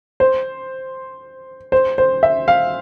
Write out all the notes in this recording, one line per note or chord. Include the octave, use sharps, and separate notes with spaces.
C5
C5
C5
E5
F5